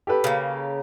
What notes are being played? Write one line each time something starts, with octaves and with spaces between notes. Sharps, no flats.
G4 A4 B4
C#3 A#3